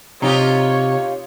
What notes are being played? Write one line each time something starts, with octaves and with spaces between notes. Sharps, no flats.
C3 D#4 F4 G4 C#5